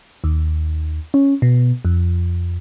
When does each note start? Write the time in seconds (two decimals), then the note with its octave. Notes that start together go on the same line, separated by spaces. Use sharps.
0.24 D#2
1.14 C#4
1.42 B2
1.85 F2